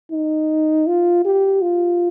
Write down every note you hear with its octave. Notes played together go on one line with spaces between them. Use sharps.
D#4
F4
G4
F4